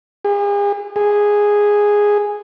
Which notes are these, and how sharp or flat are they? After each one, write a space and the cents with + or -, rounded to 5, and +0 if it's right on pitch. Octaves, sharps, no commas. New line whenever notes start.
G#4 -40
G#4 -5